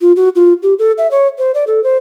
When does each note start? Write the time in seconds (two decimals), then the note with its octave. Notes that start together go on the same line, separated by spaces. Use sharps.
0.01 F4
0.16 F#4
0.35 F4
0.63 G4
0.79 A4
0.98 E5
1.11 C#5
1.38 C5
1.54 D5
1.67 A4
1.84 C5